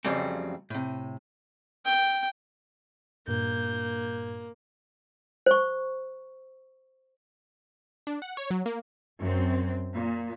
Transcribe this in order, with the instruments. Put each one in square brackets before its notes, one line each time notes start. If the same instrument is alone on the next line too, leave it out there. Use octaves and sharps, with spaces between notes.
[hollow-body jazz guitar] F2 C#3 F#3 G3 A3 C4
A2 C3
[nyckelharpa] G5
[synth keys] G2 A#2 [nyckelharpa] A#3 [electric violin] G6
[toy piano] C5 C#6
[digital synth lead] D4
F#5
C#5
F#3
A#3
[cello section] F#2 C4
A#2